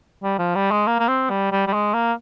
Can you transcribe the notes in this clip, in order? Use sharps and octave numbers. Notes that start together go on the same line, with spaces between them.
G3
F3
G3
G#3
A#3
A#3
C4
G3
G3
G3
G#3
A#3